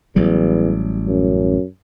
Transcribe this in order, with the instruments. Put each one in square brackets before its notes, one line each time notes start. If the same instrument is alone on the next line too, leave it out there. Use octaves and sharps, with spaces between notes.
[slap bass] A1 F#3 G3 [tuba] E2
[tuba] F#2